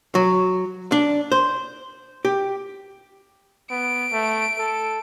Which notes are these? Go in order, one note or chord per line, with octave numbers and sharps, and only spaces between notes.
F#3
D4
C5
G4
B3 D7
A3
A4